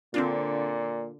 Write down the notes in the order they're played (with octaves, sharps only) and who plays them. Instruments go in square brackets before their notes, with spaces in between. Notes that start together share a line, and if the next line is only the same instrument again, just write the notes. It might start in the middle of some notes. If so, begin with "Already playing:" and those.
[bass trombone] A#2 [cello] D3 [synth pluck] C4 D4 F4